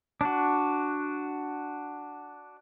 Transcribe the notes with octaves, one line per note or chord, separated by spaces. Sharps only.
D4 F#4